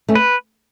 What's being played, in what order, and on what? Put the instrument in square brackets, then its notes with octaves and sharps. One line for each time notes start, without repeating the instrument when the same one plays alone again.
[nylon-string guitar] A3 C#4
[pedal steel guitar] B4